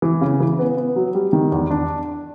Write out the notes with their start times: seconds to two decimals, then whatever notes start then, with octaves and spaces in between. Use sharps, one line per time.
0.02 E3
0.21 C#3
0.40 E3
0.59 B3
0.77 B3
0.96 F#3
1.15 G3
1.33 D#3
1.52 E2
1.71 D4